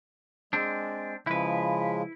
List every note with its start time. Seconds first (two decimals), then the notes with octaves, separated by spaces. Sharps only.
0.53 G#3 C4 D4
1.27 C#3 F3 G#3 E4 B4